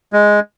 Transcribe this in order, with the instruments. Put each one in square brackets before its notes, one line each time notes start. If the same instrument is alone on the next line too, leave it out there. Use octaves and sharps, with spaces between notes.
[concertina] G#3